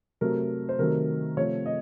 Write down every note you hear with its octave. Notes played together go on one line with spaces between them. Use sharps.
C3 F#3 A3 A#4
C5
C3 D#3 F#3 A3 A#4
C3 F3 A3 C#5
D#5